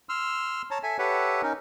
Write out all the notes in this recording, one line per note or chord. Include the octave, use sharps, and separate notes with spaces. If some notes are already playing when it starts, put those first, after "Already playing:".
C6 E6 F6
C#5 A5 A#5
A4 E5 G#5
G4 A4 B4 C#5 E5 F#5
C#4 D#4 A#4